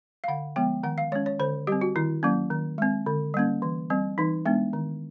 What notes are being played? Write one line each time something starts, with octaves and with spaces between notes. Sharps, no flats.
F5
D3 F#5
F3 G#3 B3 G5
D#3 F#5
F5
G#3 C#4 C#5
C#5
D3 C5
G3 C4 G4
F#4
D#3 E4
F#3 A#3 C#4
D#3
G#3 C4
D3
G3 A#3 C#4
E3
G3 C4
E3 D#4
G#3 B3 D4
D#3